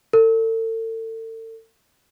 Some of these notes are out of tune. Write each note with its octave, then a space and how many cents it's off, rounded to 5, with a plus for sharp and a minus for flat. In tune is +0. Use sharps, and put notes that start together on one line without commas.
A4 +40